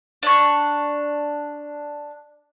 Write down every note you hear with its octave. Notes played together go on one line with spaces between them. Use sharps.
D4 C#6